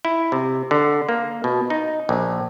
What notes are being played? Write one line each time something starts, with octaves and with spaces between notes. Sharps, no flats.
E4
C3
D3
A#3
B2
D#4
A#1